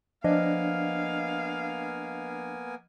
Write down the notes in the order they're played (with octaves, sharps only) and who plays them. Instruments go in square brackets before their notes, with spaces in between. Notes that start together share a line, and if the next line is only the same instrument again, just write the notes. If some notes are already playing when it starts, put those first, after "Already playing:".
[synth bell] F3 D#5 [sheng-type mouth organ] A#3 B3 G#5 [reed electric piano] D4 [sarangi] F5